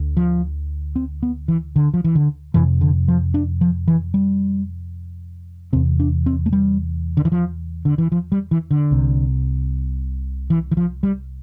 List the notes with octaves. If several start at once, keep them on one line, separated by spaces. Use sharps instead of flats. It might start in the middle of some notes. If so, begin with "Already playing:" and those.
Already playing: D2 D3
F3
C4
B3
E3
D3
F3
E3
D3
F2 C3 E3
D3
F3
D4
F3
E3
G3
E2 C3 C4
D4
C4
A3
G3
D3
E3
F3
D3
E3
F3
G3
E3
D3
C2 C3
E3
E3
F3
G3